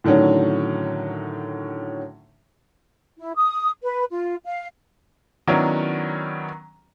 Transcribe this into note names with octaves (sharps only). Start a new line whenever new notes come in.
A2 D3 D#3 F#3 C#4
E4
D#6
B4
F4
F5
D#3 F#3 B3 C#4 D4 E4